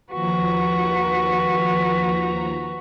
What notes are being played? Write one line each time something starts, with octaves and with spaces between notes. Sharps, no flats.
D#2 F3 F#4 B4 A#5